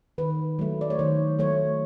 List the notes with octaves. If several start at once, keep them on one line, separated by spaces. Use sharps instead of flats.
D#3 B4
F#3 A3
D5
C#5
D#3 C5
F#3 A3 C#5